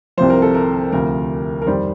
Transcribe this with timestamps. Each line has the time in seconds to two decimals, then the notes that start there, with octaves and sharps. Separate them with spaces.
0.17 C2 C3 F3 C5
0.30 A#4
0.42 A4
0.54 A#4
0.92 D2 C3 F3 A#4
1.62 A#4
1.67 F2 D#3 G3 C5